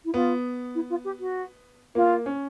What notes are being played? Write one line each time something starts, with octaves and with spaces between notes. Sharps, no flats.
E4
B3 F4
E4
F4
G4
F#4
A#3 F4
C#4